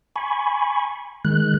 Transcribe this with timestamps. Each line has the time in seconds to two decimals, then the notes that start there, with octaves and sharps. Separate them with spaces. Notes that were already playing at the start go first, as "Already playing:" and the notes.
0.16 G#5 B5 C#6
1.25 D#3 G#3 F#6